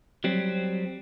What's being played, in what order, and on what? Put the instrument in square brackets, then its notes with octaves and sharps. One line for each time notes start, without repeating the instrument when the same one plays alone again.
[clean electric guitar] F#3 G3 C4